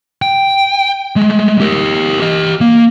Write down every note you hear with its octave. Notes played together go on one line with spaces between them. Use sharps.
G5
G#3 A3
G4 A#4
G4 D#5
A#3